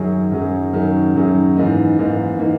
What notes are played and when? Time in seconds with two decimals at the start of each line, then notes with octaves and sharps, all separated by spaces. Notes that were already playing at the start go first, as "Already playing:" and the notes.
Already playing: F#2 D#3 F#3 C#4 G#4
0.31 F#2 D#3 F#3 C#4 G#4
0.73 F#2 D#3 F#3 C#4 G#4
1.15 F#2 D#3 F#3 C#4 G#4
1.56 G#2 E3 A#3 D#4
1.97 G#2 E3 A#3 D#4
2.39 E3 A#3 D#4